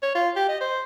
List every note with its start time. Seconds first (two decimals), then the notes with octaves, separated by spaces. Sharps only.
0.02 C#5
0.15 F4
0.36 G4
0.49 D#5
0.61 C5